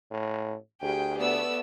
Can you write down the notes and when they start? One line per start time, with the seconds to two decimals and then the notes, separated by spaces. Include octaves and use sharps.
0.11 A2
0.82 D2 G4 G#4 G5
1.18 A3 B3 D5 E6